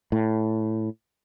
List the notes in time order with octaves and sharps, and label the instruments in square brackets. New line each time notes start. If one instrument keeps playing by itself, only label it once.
[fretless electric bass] A2